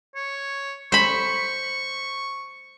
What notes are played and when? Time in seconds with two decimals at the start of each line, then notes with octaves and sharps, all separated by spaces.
0.16 C#5
0.92 C5 B5 C#6